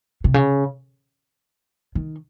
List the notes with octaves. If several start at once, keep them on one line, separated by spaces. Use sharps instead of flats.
C3
C#3
D#3